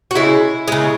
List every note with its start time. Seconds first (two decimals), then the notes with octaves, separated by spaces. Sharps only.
0.11 F#4
0.15 C#3 G#3 E4
0.68 C#3 G#3